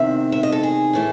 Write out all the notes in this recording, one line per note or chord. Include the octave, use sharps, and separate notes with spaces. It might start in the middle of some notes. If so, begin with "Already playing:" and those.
Already playing: E2 C3 D#3 E5
E5
D#5
A4
G#4
A2 E3 A3